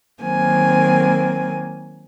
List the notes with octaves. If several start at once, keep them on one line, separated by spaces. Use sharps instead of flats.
D#3 F#3 A#3 C4 G#5